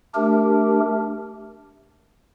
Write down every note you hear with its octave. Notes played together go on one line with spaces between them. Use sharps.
A3 D4 G4 A#4